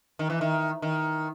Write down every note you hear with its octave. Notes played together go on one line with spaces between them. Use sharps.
D#3
E3
D#3
D#3